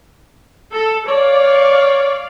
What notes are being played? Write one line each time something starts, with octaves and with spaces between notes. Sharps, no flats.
A4
C#5 D5 F5